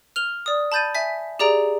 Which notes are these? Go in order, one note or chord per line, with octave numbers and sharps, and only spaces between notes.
F6 F7 G7
D5 D#6
A5 B5 G6 A6 D#7
E5 G#5 B6
G4 G#4 D5 A#5 D7